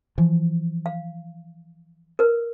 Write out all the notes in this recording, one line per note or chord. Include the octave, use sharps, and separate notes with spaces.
E3 F3
F5
A#4 B4